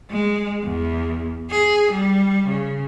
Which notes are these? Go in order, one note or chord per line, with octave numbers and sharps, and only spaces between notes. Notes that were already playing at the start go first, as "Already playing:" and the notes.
G#3
E2
G#4
G3
C#3